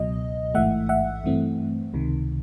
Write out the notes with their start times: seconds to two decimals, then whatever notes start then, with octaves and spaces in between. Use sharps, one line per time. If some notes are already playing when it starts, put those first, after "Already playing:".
Already playing: C#2 B2 F#3 D#5
0.54 A1 G#2 E3 A3 E5 F#5
0.89 E5 F#5
1.24 G2 E3 A3 C4
1.94 C#2 C3 D#3